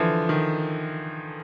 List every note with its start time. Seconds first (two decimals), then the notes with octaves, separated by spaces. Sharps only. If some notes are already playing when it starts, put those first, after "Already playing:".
Already playing: D3 E3 F3
0.29 D#3